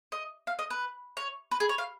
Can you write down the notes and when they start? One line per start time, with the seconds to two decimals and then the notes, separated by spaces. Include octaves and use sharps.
0.12 D#5
0.47 F5
0.59 D#5
0.70 B4
1.17 C#5
1.51 B4
1.60 G#4
1.69 C#5
1.78 F5